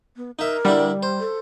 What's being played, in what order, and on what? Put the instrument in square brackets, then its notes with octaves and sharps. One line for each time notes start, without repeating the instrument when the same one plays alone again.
[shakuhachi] B3
[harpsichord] D#4 E5 [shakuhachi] A#4
[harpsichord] D3 D4 E4 [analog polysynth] G3
[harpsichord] C5
[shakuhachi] A4